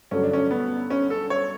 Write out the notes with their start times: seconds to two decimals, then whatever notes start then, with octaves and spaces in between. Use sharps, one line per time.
0.11 G2 D3 F#3 A3 C#4
0.23 D4
0.33 C#4
0.51 B3
0.90 C#4
1.10 A4
1.30 C#5